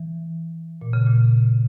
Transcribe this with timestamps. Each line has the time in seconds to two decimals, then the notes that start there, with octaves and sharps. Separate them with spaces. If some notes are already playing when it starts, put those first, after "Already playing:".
Already playing: E3
0.81 A#2
0.93 C#3
1.06 A#2